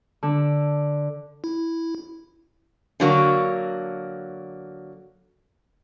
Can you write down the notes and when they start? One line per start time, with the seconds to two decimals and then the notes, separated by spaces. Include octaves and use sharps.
0.23 D3 D4
1.44 E4
3.00 D3 F#3 A#3 F#4